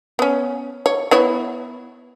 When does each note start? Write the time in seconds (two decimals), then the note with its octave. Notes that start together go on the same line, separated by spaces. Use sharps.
0.19 B3 C#4
0.86 C#5
1.11 B3 E4 C#5